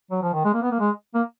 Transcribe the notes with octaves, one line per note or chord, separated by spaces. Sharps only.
F#3
F3
D#3
G#3
A#3
B3
A#3
G#3
A#3